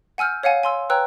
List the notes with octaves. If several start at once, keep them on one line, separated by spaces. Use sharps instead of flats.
F#5 G#5 E6 F6 G6
C#5 F5 F#5 G#5
G#5 C6 E6
B4 C#5 G5 A#5 E6 F#6